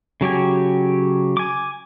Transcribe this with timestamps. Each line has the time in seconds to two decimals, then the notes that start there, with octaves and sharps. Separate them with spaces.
0.21 C#3 F#3 G4 G#5
1.37 G#5 D6